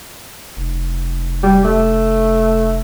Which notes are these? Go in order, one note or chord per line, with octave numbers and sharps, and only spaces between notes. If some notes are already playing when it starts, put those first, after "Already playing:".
F1
G3
A3